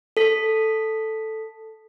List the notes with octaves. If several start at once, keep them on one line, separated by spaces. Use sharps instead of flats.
A4 B6